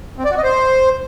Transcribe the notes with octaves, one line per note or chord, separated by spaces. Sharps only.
C4
D5
F#4
D#5
C5